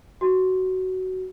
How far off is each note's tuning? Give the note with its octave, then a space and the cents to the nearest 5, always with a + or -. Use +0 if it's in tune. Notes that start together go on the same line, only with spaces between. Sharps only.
F#4 +15